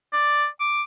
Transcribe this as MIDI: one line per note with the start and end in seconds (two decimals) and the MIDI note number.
0.13 0.46 74
0.60 0.82 86